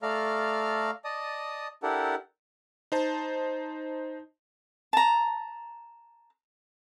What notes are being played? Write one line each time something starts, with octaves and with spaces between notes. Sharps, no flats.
A3 A4 D5 F5 A#5 F6
D5 D#5 A5 D#6
D4 E4 G4 A4 A#4 F#5
D#4 C5 A5
A5 A#5